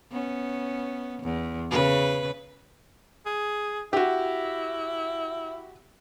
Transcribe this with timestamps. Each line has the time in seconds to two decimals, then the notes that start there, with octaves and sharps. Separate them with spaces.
0.12 B3 C#4
1.23 E2
1.71 C#3 B4
3.26 G#4
3.93 E4 F#4 G4